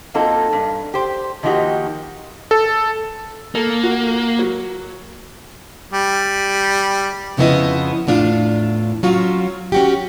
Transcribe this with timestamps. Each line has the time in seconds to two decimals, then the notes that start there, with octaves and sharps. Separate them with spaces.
0.14 F#3 A#3 C4 D#4 F4 A4
0.53 G2
0.94 G4 C5
1.43 D#3 F3 A#3 D#4 F#4 G4
2.51 A4
3.55 A#3 A4
3.83 F#4
4.39 F#3
5.93 G3
7.37 F2 C#3 F3 B3 E4 D#5
8.07 E2 A2 D4 F4
9.03 F#3 C#4 F4 F#4
9.72 C#4 F#4 G4